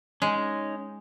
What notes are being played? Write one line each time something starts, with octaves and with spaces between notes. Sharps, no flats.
G#3 C#4 D#4